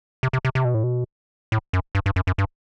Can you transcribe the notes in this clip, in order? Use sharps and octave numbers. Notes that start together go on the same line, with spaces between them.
C3
C3
C3
C3
B2
A2
B2
A2
F#2
G2
G2
F#2
F#2
G2